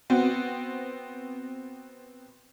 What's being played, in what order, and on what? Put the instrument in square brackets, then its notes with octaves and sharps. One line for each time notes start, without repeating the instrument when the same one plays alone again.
[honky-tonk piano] B3 C4 F#4